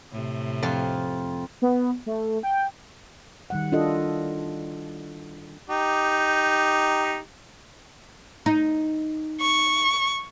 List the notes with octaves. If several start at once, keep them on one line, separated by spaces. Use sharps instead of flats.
A2 C3
F2 F4
B3
A3
G5
D#3 G3 F#5
D4 E4 F4 A4 D#5
D#4 G4
D#4
C#6